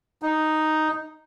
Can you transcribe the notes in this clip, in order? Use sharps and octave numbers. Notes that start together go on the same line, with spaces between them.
D#4